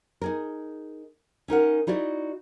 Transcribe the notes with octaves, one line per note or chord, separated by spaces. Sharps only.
D#4 G#4 A#4
C#4 D#4 A#4 F#5
D#4 E4 F#4 D5 D#5